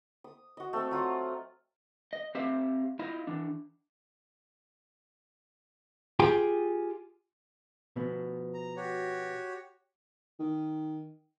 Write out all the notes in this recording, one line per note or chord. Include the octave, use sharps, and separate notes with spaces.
D#6
F#4 D#5
A3 C4
F#3 F4 F#5
D#5
C4 G4 E5 F5
E4 F4 D#5
E3 D4
F4 G4 G#4 G5
B2 F3 B3
A#5
F#4 G4 C#5
D#3